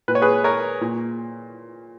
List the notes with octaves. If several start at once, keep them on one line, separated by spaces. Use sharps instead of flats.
A#2 B4
C#5
G#4 B4
A#4 C#5
A#2